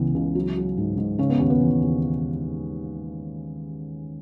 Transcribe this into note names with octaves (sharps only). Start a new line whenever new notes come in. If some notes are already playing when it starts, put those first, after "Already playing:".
Already playing: C#2 C#3 E3 B3
C#2
F#3
F#3
G#2
G#2
C#3 C#4
B3
D#2 C#4
B3
E3
D#2